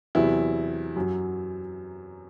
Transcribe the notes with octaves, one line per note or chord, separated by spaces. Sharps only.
E2 C3 F#3 E4
F#2 F#3